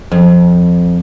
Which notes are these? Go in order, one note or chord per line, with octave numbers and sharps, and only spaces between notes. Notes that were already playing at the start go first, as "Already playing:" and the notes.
F2